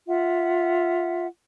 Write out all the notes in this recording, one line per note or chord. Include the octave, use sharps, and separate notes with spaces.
F4 E5 F#5